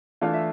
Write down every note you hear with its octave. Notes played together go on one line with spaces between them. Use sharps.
E3 A3 D4 F4 F5
E5